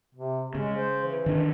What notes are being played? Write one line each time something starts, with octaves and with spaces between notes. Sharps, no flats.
C3
C#3 G#3
C5
E3
D#3 D4